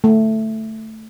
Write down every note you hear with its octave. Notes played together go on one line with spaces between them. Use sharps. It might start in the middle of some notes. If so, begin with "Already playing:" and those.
A3